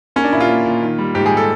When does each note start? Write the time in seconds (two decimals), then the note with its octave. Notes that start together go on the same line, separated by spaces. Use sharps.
0.16 A#3 C#4
0.24 D4
0.32 A#2 E4
0.41 F4
0.49 A#3
0.66 A#2
0.82 D#3
0.98 G3
1.15 G#2 G4
1.26 G#4
1.31 G3
1.37 A4